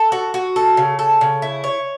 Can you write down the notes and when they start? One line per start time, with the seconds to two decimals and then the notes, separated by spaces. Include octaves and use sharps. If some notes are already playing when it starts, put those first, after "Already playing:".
Already playing: A4
0.12 F#4
0.34 F#4
0.56 A4
0.77 C#3
0.99 A4
1.21 C#3
1.42 E4
1.64 C#5